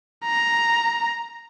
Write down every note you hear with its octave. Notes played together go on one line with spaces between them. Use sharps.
A#5